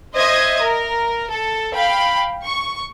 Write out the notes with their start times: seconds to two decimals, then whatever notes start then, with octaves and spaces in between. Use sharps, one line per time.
0.15 C5 D#5 E5 G#6
0.62 A#4
1.31 A4
1.74 F5 G5 B5
2.43 C#6